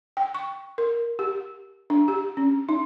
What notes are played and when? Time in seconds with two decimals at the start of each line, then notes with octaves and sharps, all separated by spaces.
0.17 G5
0.35 C#6
0.78 A#4
1.19 G4
1.90 D4
2.08 G4
2.37 C#4
2.69 D#4